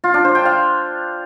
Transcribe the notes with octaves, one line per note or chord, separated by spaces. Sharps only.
F4
D4
C5
G5
F5